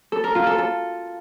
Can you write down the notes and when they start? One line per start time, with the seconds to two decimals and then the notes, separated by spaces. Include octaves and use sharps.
0.12 A4
0.24 A#4
0.35 F4
0.47 A4
0.58 A4